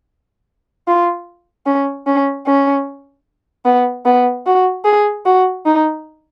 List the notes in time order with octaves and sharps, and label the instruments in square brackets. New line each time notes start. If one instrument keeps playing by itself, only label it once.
[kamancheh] F4
C#4
C#4
C#4
B3
B3
F#4
G#4
F#4
D#4